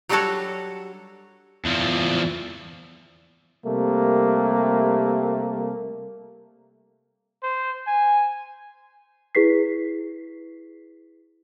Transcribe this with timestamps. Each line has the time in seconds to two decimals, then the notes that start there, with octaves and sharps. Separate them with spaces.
0.09 F#3 G3 D4 F#4 A4 C#5
1.65 E2 F3
3.64 C3 G3 A3 A#3
7.43 C5
7.87 G#5
9.35 E4 G#4 B4 B6 C7